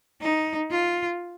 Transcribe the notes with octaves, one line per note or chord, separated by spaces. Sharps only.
D#4
F4